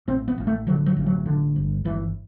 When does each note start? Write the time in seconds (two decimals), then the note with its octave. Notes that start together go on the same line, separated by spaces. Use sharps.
0.08 A1 C4
0.28 B3
0.38 A1
0.47 A3
0.67 D3 F#3
0.86 F#3
0.97 A1
1.06 F#3
1.26 D3
1.56 G1
1.85 G1 E3